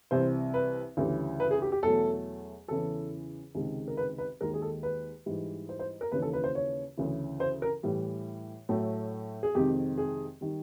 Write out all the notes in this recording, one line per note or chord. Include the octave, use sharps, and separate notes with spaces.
C2 C3 E3 C5
B4
D2 C#3 E3 G3
B4
G#4
G4
G4
E2 B2 F#3 A3 A4
E2 C#3 E3 A4
C#2 C3 D#3 G#3
A#4
B4
B4
D#2 D#3 G#3 A#4
G#4
A4
B4
G#2 E3 G3
C5
C5
A#4
D#2 C#3 E3 B4
A4
B4
C5
C#5
D2 C#3 E3
C5
A#4
A2 E3 G3
A2 F#3 A3
G#4
F2 C3 D#3 G#3 G4
G#4
D#3 G3